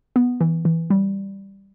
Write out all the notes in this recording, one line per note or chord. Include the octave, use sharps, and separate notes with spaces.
B3
E3
E3
G3